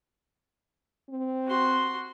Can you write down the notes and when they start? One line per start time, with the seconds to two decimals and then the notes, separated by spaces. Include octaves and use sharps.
1.10 C4
1.47 F#4 C6